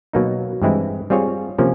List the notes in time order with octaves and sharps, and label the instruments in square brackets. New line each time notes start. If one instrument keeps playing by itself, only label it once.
[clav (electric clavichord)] B2 F#3 A#3 D#4
G2 E3 G#3 C4 E4
G3 C4 F4 G#4 C#5
C3 F3 A#3 C#4